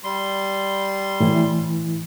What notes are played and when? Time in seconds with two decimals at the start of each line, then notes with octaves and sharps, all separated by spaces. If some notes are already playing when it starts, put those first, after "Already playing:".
0.04 G3 C6
1.20 A2 E3 E4